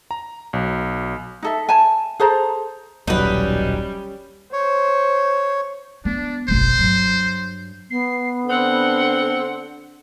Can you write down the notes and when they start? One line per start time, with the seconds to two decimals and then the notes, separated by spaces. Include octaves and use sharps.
0.11 A#5
0.53 B1
1.43 D#4 A4 E5
1.69 G#5 A5
2.20 G#4 A4 C5 A#5
3.07 D#1 B1 F#3 G3 C#4 D#4 B4
4.53 C5 C#5
6.05 B3 D4
6.48 F#1 B1 C5
6.79 G2 F#3
7.90 B3 C7
8.49 D3 C4 F#5